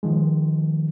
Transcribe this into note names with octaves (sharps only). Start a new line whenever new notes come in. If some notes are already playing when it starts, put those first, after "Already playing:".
D#3 F3 G#3